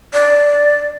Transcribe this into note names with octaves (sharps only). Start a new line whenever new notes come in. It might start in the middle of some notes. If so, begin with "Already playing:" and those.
D5